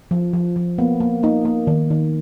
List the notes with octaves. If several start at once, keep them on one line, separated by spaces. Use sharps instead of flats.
F3
F3
F3
A#3 B3
A#3
A#3 D#4
A#3
D#3
D#3